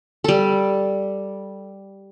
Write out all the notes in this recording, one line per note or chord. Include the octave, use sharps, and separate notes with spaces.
G3 A4